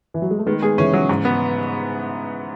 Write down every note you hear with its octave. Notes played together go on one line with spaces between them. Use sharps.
E3
F#3
G#3
A3
D#3 G#3 B3
G#3 B3 G#4
C#3 E3 C#4
F#3
G#2
B3